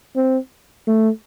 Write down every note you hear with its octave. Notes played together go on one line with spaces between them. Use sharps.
C4
A3